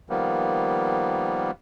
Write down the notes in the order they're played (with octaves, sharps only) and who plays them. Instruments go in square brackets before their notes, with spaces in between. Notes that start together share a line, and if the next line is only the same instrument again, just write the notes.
[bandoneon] D#3 F3 G3 A#3 B3